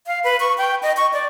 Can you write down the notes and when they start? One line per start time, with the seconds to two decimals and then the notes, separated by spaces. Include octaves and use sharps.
0.07 F5
0.24 B4
0.40 C#6
0.58 G5
0.83 D#5
0.97 C#6
1.13 D5